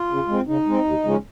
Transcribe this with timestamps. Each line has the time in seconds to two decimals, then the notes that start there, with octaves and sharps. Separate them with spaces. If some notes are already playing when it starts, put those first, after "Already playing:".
Already playing: F4
0.10 C#3
0.28 G#3 C4
0.47 C#3 D#4
0.66 G#3 C4
0.84 D#2
1.04 C#3 F3 G#3 C#4